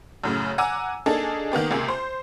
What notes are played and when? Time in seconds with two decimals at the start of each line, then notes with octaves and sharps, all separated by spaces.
0.24 F#2 A2 C#3
0.58 F#5 G#5 A#5 D6 E6
1.06 A#3 D4 D#4 G#4 A4
1.52 D#3 A#3 B3 G4
1.71 C#2 C3 A#3 G#4 G6
1.89 C5